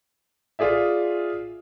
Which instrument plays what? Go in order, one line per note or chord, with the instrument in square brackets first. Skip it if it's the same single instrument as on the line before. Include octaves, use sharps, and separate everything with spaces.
[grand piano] F4 G#4 D5 E5